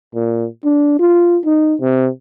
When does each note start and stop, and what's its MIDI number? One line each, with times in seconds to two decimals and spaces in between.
0.15 0.46 46
0.64 0.96 62
0.99 1.39 65
1.45 1.75 63
1.81 2.08 48